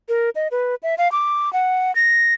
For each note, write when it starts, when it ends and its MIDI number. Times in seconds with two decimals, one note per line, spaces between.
0.09 0.30 70
0.35 0.48 75
0.51 0.75 71
0.83 0.95 76
0.98 1.11 77
1.12 1.52 86
1.53 1.94 78
1.95 2.34 94